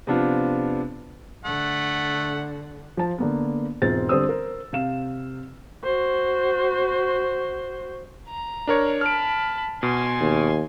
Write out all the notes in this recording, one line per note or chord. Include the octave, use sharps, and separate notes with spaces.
C3 F3 B3 D4 F4
D3 A3 F#5
F3 C5 A5
D3 A#3 B3
E1 G#2 G#3 C4 F4 A6
D3 G3 C4 C5 D#6 E6
A#4 C5
C3 F5 E7
F#4 C5
A#5
D4 A#4 C#5
A5 B5 F6 D7
B2 G#5 C6
D#2